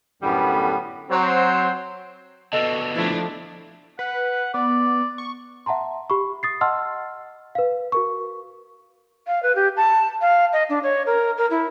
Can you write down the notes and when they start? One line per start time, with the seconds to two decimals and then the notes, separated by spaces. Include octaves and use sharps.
0.23 F#2 A2 D3 G3 B3
1.10 F#3 C4 C5
2.53 B2 D3 A4 D#5
2.95 F3 A3 D4 E4
3.99 B4 F#5
4.54 B3 D5
5.18 C#6
5.66 E5 F#5 A5 A#5 C6
6.10 G4 B5 C#6
6.43 D#6 A6 C7
6.61 D#5 F#5 A5 C6 E6 F6
7.55 B4 F5
7.92 F#4 A#4 C#6
9.27 F5
9.43 B4
9.55 G4
9.77 A5
10.21 F5
10.53 D#5
10.69 D4
10.83 C#5
11.06 A#4
11.37 A#4
11.51 E4